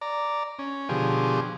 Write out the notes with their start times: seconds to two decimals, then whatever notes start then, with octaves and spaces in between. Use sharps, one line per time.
0.01 D5 A#5
0.59 C#4
0.89 B2 D3 F3 G4 G#4